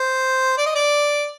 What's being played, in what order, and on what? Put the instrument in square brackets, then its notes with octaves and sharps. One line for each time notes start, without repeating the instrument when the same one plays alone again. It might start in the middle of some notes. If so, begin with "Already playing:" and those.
Already playing: [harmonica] C5
D5
D#5
D5